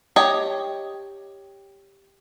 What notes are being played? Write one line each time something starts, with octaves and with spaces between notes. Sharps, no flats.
G4 C#5 D#5